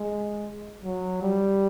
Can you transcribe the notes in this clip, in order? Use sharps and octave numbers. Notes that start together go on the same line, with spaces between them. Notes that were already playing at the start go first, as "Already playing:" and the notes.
Already playing: G#3
F#3
G3